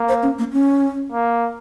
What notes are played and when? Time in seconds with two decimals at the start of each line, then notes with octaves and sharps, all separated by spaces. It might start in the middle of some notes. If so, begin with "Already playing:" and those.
Already playing: A#3
0.09 C5
0.23 C#4
0.39 A#3
0.52 C#4
1.12 A#3